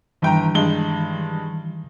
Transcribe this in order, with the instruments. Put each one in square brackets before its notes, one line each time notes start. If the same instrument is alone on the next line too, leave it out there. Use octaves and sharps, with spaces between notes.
[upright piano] G1 G5 A#5 [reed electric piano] D#3 E3 G3
[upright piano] G2 G#3 G7